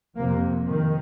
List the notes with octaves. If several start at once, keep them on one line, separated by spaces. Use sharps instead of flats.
F2 C3 A#3
D#3